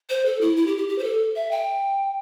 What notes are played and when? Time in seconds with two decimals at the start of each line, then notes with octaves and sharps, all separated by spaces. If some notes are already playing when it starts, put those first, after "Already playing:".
0.10 C5
0.25 A4
0.41 E4
0.57 E4
0.67 G4
0.78 G4
0.89 G4
0.99 C5
1.04 A4
1.36 E5
1.51 G5